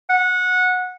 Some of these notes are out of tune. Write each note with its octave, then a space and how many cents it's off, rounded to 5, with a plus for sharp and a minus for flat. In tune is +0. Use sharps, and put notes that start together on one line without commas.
F#5 -20